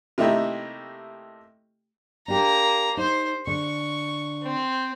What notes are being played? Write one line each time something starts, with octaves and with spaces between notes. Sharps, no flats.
C3 A3 A#3 D#4 E4 G4
A#3 D4 G4 A#5
D#4 C5
D3 C#6
C4